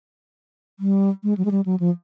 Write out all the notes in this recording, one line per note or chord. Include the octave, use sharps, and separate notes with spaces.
G3
G#3
F#3
G#3
G3
F#3
F3